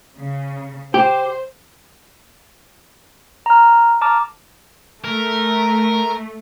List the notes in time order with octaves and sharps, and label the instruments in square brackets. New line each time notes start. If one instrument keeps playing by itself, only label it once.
[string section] C#3
[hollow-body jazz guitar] G4 [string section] C5
[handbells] A#5 F6
A5 A#5 D6 F6
[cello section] A3 [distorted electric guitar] A#4